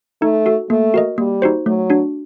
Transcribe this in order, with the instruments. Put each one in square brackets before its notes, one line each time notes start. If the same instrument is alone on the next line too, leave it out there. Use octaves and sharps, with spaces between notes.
[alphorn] A3 [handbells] D#4
[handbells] F#4 A4
[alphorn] A3 [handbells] A#3
[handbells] F#4 A#4 D#5
[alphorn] G3 [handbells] A#3
[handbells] D#4 F#4 C5
[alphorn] F#3 [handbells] A3
[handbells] D4 F#4